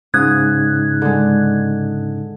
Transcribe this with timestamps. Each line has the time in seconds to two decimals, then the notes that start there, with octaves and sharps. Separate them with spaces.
0.14 G#2 C#3 D#6 F#6 G#6
1.02 D3 G#3